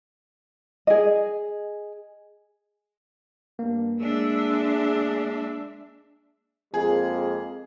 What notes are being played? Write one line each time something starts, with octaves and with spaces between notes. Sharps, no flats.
G#4 D#5
G2 A#3
G#3 D4 G#4 E5
F2 G#3 A#3 G#4